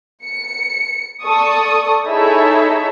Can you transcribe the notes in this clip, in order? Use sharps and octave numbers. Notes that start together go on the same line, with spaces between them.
C#7
A4 D5 C#6 D#6
D#4 E4 G#4 A4 C#5 E5